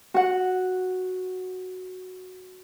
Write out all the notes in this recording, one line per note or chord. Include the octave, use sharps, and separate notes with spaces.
F#4 F#5